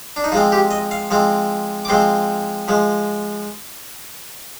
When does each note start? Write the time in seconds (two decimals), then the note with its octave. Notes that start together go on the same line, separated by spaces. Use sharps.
0.16 D4
0.24 D#4
0.32 F3 G#3 C4 F4
0.52 G4
0.71 D#5
0.91 F5
1.11 F3 G#3 C4
1.85 D6
1.88 F3 G#3 C4 C6
2.68 F3 G#3